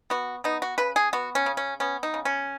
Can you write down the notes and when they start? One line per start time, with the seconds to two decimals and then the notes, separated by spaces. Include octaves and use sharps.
0.10 B3 F#4
0.44 B3 D#4
0.62 F#4
0.78 C#3 B4
0.96 G#4
1.13 B3 F#4
1.35 C#4
1.46 C#3
1.57 C#4
1.80 B3 C#4
2.03 D#4
2.14 C#3
2.25 C#4